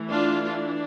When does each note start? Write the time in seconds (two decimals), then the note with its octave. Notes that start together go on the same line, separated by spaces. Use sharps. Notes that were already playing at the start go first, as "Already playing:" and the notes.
Already playing: E3 A3
0.10 D4 F4
0.46 D4